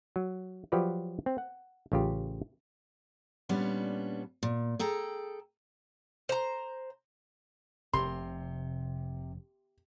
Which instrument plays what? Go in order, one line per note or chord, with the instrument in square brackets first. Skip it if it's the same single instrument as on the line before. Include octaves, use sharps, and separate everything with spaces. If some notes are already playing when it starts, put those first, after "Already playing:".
[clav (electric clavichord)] F#3
F3 F#3 G4 B4 D5
C4
F#5
A1 C#3 F4 G4
[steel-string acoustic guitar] A#2 G3 B3 C#4 D4
A#2
G#4 A4 G5 A#5
[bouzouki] C5 A#5
[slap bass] F1 [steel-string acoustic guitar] C3 [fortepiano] C6